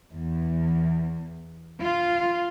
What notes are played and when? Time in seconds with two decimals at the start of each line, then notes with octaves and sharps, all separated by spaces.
0.12 E2
1.80 F4